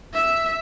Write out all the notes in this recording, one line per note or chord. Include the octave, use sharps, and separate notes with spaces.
E5